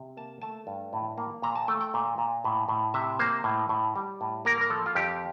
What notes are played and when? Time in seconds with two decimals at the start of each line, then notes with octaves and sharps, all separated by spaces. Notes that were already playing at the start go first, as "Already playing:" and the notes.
Already playing: C3
0.17 A#3 A5
0.42 A3 A5
0.67 G2
0.93 A2
1.18 A#3
1.42 A#2 A#5
1.56 A5
1.68 A3 G5
1.81 G5
1.94 A#2
2.18 A#2
2.44 A2
2.68 A2
2.94 C3 E5
3.19 A#3 C5
3.44 A2
3.69 A2
3.96 G3
4.21 A2
4.45 A#3 A#4
4.61 A#4
4.70 F3 A4
4.86 F4
4.95 F2 G4